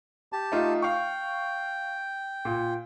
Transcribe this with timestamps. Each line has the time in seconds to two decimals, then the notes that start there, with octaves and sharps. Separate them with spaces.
0.33 G4 A5
0.52 A3 D#4 F4
0.82 F5 G5 C#6
2.45 A#2